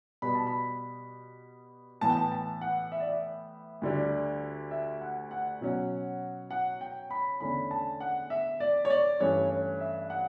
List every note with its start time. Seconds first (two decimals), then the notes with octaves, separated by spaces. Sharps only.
0.22 B2 G3 B3 B5
0.35 A5
0.47 B5
2.01 A2 E3 B3 A5
2.10 G5
2.17 A5
2.32 A5
2.61 F#5
2.92 E5
3.00 D5
3.09 E5
3.82 D2 D3 G3
4.71 E5
5.01 F#5
5.31 F#5
5.61 B2 F#3 C#4
6.51 F#5
6.81 G5
7.10 B5
7.40 E2 D3 A3 C#4 B5
7.71 A5
8.00 F#5
8.30 E5
8.60 D5
8.85 C#5
8.90 D5
9.20 G2 E3 A3 C#4 C#5
9.50 C#5
9.80 E5
10.10 F#5